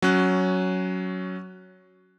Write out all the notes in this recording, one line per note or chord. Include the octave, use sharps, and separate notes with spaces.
F#3 C#4 F#6